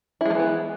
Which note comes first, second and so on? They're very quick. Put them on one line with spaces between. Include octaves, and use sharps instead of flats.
E4 G#3 F3 E3 B3